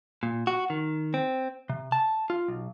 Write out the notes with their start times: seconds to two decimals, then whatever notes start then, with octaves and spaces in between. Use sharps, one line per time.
0.23 A#2
0.47 F#4
0.70 D#3
1.14 C4
1.69 C3
1.92 A5
2.30 F4
2.48 B1